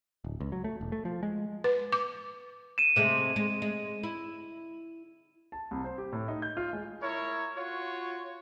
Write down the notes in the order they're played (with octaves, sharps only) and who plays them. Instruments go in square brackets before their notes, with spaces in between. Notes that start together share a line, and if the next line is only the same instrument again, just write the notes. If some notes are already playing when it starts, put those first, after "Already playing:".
[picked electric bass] D1
C#2
F#3
A3
E1
A3
F3
G#3
[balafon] B4
D6
[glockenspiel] D#7 E7
[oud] C3 G#3 A3
G#3
G#3
E4
[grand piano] A5
C2
C5
G4
A2
D#4
G6
F4
G#3
[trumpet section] E4 A#4 C#5
F4 F#4 C#5